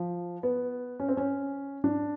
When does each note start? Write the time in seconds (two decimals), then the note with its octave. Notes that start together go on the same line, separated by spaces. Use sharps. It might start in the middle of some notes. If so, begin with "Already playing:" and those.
Already playing: F3
0.43 B3
1.00 C#4
1.08 C4
1.17 C#4
1.84 D4